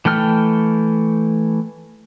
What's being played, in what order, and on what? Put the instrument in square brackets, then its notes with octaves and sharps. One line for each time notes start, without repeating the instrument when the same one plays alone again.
[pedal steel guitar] E3 A3 G5 F6